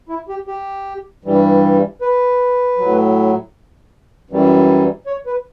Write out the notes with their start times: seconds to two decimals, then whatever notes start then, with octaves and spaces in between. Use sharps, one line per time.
0.09 E4
0.29 G4
0.47 G4
1.24 G2 E3 G3
2.01 B4
2.78 A2 F#3
4.30 F#2 E3 G3
5.07 C#5
5.26 B4